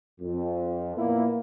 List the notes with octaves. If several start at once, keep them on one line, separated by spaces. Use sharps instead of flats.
F2
A#2 A#3 B3 E4